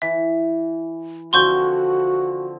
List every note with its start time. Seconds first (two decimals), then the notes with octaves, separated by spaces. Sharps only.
0.02 E3 E5
1.33 D3 F3 C4 F#4 C6 C#6 G6